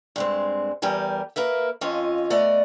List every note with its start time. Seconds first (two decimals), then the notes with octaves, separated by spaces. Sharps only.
0.16 G2 G#3 C4
0.82 E2 G3 G4 A#4 G#5
1.36 A#3 A#4 B4 E5
1.81 F2 C#4 F4 D#5
2.30 A3 B3 D5 D#5